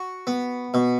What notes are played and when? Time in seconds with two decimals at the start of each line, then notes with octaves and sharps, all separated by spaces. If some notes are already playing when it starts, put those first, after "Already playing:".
Already playing: F#4
0.27 B3
0.74 B2